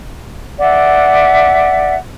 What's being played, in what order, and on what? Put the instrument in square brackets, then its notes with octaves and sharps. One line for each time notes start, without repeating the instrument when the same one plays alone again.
[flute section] D5 E5 F#5